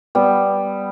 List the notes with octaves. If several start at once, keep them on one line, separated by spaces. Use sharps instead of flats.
G3 B3